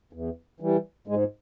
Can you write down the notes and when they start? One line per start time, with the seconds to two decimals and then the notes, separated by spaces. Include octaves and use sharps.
0.13 E2
0.60 E3 G3
1.07 G#2 G#3